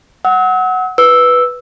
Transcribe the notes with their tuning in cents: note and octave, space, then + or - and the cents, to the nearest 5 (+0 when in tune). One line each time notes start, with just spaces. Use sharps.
F#5 +0 E6 -45
B4 +0 E6 +0